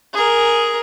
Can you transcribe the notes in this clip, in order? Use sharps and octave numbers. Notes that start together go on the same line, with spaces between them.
G#4 A#4